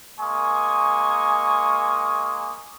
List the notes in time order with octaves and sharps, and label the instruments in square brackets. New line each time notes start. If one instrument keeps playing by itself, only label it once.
[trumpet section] G#3 A#3 G#5 C#6 D#6